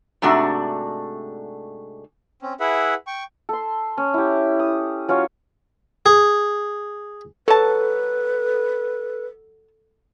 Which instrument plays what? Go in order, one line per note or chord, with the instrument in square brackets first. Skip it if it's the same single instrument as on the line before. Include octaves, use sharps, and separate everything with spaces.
[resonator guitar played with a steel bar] G#2 C3 A3 D4 F#4
[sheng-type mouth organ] C4 C#4
E4 G#4 B4 E5 F#5
G5 C#6
[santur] A4 C6
C#4
E4 G4
D#6
F#3 C#4 F4 C#5
[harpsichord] G#4
[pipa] F#3 A5 [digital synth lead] A4 [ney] B4